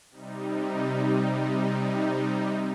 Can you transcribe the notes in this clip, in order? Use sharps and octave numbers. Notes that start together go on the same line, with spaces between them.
C3 G3 D#4